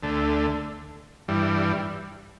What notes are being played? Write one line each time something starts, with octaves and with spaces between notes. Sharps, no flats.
D2 D3 A3
G2 E3 G3